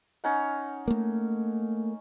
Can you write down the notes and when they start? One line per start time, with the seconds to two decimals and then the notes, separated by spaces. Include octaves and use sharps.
0.24 C#4 D#4 F#5
0.88 A3 A#3